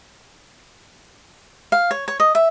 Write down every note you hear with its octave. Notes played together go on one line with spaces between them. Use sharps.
F5
C#5
C#5
D#5
E5